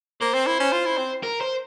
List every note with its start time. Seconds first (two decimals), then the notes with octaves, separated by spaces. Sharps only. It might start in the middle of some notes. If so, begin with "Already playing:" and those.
0.21 A#3 C5
0.34 C4
0.47 E4
0.60 C#4
0.72 F4
0.86 E4
0.98 C4
1.23 A#4
1.41 C5